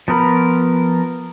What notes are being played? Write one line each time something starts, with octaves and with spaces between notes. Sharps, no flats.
F3 B3 A#4 B5